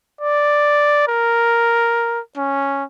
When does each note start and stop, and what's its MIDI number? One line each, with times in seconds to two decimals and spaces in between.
0.21 1.05 74
1.08 2.20 70
2.37 2.84 61